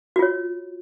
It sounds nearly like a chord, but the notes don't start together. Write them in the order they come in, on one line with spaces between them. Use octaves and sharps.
F#4 F4 C#5